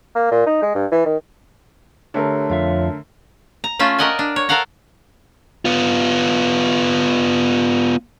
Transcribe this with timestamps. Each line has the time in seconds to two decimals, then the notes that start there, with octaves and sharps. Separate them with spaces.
0.15 A#3
0.31 A#2
0.46 D#4
0.62 G#3
0.75 G2
0.92 E3
1.06 D#3
2.14 D3 A3 G4 A#4 C#5
2.50 F2 F4 C#5 E5
3.64 A#5
3.79 A3 C#4 F4 E5
3.99 A#4 D5 D#5 F#5 G#5
4.19 D4
4.36 C#5
4.49 A4 A#4 F5 F#5 A#5
5.65 B3 F4